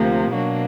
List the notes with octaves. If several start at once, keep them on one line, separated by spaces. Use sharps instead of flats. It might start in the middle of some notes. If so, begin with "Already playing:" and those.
Already playing: D2 C3 F3 A#3
B2 F#3 A#3 D4